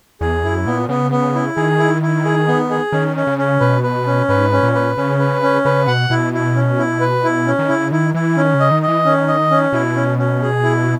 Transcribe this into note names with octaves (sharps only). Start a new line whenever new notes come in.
E2 G#4
F#2 E4
A#2 B3
C#3 B3
B3
E4
D#3 G#4
E4
E4
G#4
B3
G#4
D#3 C#4
C#4
C#3
C#4
B2 B4
B4
C#4
G#2 B4
C#4
A#2
B4
C#3 C#4
B4
C#4
C#3 B4
B2 F#5
B2 E4
E4
C#4
E4
B4
E4
C#4
D#3
C#3 E4
D#3 E4
E3 E4
D#3 C#4
C#3
D#5
D#3
D#5
E3
D#3 C#4
D#5
C#4
B2 E4
C#4
C#4
G#4
E4